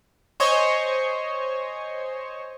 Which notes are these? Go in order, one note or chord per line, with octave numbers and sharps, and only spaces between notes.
C5 C#5 D#5 G#5 C#6